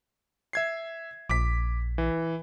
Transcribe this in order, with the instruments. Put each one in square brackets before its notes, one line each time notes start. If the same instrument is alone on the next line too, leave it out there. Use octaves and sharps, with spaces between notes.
[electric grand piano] E5 G#6 C7
[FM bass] A#1 [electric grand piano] D6 B6
[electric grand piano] E3